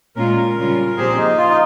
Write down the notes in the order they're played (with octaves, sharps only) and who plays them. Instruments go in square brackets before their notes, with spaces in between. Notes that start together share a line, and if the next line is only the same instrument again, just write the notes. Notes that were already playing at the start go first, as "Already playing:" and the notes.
[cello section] A#2 G#3 C#4 F4 [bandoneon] A#4
[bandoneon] A#4
[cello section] C#3 G3 C#4 F4
[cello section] A#2 F3 C4 G4 C5 [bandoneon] G#4
[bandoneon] D#4
F4
D#4